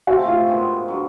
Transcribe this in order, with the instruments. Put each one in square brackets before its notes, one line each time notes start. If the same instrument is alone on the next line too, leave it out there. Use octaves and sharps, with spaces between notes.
[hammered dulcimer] C#3 F3 A3 C4 [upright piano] F#4
[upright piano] F4
[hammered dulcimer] G#2 D#3 G#3 B3
D3 F#3